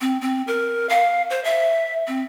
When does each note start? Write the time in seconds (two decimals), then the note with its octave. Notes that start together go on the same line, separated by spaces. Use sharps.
0.01 C4
0.21 C4
0.47 A#4
0.89 F5
1.30 C5
1.44 E5
2.07 C4